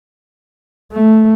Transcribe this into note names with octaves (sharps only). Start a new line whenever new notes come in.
A3